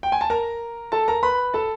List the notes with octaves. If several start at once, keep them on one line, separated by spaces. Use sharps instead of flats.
G5
G#5
A5
A#4 A#5
A4 A5
A#4 A#5
B4 B5
A4 A5